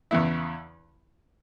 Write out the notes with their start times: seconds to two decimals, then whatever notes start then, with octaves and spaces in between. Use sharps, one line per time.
0.11 E2 C#3 E3 B3 E4